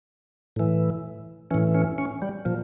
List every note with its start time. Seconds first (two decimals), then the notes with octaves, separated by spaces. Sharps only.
0.56 A2 E3
1.51 A2 E3 C#4
1.75 C#4
1.98 C#4
2.22 G3
2.45 A#2 F3